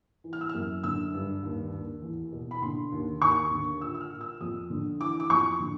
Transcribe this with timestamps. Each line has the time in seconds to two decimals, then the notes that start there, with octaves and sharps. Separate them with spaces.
0.24 E3
0.33 F6
0.41 E6
0.49 F#2 F6
0.84 D3 E6
1.14 G2
1.43 D#2
1.73 D#2
2.02 E2
2.32 B2
2.51 B5
2.62 D3 C6
2.92 D#2
3.22 D#2 C#6
3.51 D3
3.81 A#2 E6
3.94 E6
4.01 F6
4.11 A#2
4.21 E6
4.41 F2 D#6
4.70 D3
5.00 E3 D6
5.20 D6
5.30 F2 C#6
5.60 D3